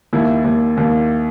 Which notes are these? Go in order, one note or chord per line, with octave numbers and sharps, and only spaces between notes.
D#2 E4
D#2
D#2